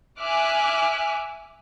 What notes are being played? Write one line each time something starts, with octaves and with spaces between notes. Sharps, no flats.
E5 G#5 D6 F6 F#6